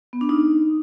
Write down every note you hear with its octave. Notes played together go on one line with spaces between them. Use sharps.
B3
D4
D#4